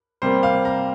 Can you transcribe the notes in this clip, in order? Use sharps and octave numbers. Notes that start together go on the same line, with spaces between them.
C3 G3 A#3 C5
F5
A#5